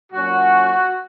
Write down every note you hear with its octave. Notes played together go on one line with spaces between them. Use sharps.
A#2 F#3 C#4 F#4